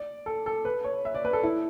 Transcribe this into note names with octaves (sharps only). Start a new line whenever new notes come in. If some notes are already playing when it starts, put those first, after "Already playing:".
Already playing: D5
A4
A4
B4
C#5
E5
D5
B4
A4
E4